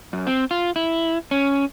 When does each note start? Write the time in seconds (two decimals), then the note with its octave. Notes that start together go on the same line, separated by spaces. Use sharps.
0.13 F#2
0.27 C4
0.51 F4
0.76 E4
1.31 C#4